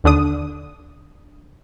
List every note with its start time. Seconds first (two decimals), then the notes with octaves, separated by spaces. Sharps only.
0.04 D#2 D3 D4 D#6